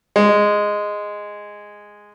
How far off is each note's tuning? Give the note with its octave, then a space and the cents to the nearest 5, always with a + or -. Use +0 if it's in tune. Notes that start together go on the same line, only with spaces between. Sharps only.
G#3 -5